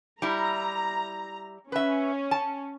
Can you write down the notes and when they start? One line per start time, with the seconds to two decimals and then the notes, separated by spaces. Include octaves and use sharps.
0.22 G3 E4 A#5
1.72 C#4 B4 E5
2.31 A5